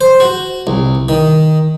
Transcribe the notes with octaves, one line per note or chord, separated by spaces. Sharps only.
C5
F#4
C2
D#3